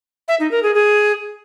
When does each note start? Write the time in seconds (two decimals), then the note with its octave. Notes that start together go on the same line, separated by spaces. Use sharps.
0.28 E5
0.40 D#4
0.51 A#4
0.63 G#4
0.74 G#4